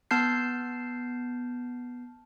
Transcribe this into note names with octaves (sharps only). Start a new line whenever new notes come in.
B3 A5 F6 G6 C7